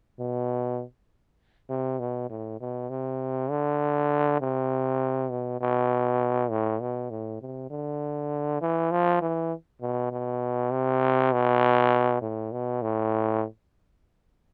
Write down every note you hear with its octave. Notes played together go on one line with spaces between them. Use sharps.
B2
C3
B2
A2
B2
C3
D3
C3
B2
B2
A2
B2
A2
C3
D3
E3
F3
E3
B2
B2
C3
B2
A2
B2
A2